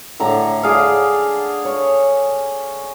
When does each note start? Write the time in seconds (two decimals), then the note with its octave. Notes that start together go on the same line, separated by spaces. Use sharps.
0.20 A2 D3 A#5 D6
0.63 G#4 D5 F5
1.65 C#5